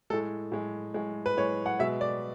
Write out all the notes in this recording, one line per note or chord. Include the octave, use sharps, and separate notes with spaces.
A2 G#3 A4
A2 G#3
A2 G#3
B4
A2 G#3 C#5
F#5
B2 G#3 E5
D5